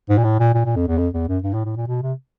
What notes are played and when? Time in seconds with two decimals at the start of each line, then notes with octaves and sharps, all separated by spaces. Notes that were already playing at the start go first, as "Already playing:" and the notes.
0.09 G#2
0.18 A#2
0.24 A2
0.40 A#2
0.54 A#2
0.65 A#2
0.76 F2
0.88 E2
0.98 F2
1.14 E2
1.28 F#2
1.43 G2
1.54 A2
1.65 A2
1.77 A#2
1.88 B2
2.02 C3